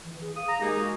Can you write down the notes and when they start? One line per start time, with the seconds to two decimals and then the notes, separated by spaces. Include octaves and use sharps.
0.04 E3
0.21 G#4
0.36 F5 D#6
0.48 A#5
0.61 G#3 A#3 D#4 G4 G#4
0.80 F#4